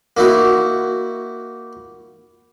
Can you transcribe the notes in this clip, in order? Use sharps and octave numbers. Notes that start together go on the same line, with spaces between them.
A#3 D#4 E4 F#4